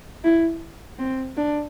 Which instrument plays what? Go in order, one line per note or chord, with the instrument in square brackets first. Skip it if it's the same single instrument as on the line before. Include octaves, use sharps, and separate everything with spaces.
[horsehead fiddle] E4
C4
D4